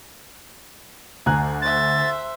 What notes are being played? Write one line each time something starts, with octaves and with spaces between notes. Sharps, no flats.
D2 G#5 A#5 F#6
C5 E5 A6